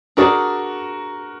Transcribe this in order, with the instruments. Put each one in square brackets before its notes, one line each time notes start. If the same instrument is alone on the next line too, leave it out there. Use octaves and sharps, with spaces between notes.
[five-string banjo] D4 G#4 D5 [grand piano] F#4 A#4